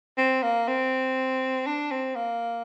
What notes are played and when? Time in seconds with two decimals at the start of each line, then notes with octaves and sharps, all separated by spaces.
0.18 C4
0.43 A#3
0.67 C4
1.67 D4
1.91 C4
2.15 A#3